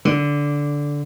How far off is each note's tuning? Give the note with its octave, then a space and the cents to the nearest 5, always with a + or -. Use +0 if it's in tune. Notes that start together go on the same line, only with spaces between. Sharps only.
D3 -10